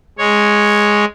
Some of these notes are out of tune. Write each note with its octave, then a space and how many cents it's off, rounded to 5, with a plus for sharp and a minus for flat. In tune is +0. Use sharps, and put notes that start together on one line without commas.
G#3 +0 C#5 +0